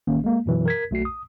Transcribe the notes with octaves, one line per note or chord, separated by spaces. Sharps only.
A1 D#3 A#3 C#4
G#3 A#3
F#2 B2 E3 F#3
A#4 G#6 B6
B1 A3 F#4 C7
D#6